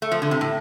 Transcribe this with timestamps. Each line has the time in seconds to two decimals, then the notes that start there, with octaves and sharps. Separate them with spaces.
0.02 A3
0.12 F3
0.22 D3
0.31 C3
0.41 A2